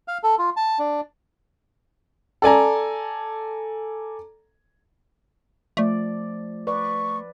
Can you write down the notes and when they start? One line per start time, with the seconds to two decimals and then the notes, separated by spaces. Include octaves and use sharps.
0.08 F5
0.24 A4
0.39 F4
0.57 A5
0.79 D4
2.42 A4 D5 G#5 A#5
5.77 F3 A3 D5
6.67 B4 D5 C#6